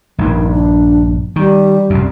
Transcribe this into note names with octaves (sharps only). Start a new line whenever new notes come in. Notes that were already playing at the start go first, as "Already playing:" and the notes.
A#1 G2 D#3
D4
D#3 G3
C2 F#2